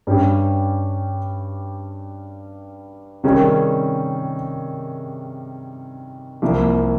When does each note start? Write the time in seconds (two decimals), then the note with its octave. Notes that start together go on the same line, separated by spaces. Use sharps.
0.07 G2 G3 C#4 G4
3.24 C3 D#3 G3 C#4 G#4
6.42 C2 C3 F3 A#3